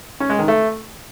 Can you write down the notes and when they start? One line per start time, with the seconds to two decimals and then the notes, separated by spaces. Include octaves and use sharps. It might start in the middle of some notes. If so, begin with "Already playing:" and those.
0.20 C#4
0.30 G#3
0.39 D#3
0.48 A3